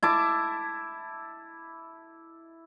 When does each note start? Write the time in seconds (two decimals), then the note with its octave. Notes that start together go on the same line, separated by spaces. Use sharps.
0.03 E4 A5 D6